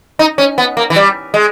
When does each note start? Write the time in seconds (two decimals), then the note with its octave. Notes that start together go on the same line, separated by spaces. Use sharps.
0.19 D#4
0.38 C#4
0.58 B3
0.77 A#3
0.90 E3
0.96 G3
1.34 G#3